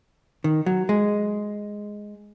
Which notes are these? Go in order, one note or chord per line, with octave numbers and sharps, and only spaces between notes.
D#3
F#3
G#3